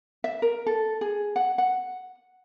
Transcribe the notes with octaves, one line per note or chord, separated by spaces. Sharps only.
E5
A#4
A4
G#4
F#5
F#5